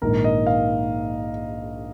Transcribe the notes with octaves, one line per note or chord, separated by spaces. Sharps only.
A#1 G#2 D#3 A#4
D#5
F5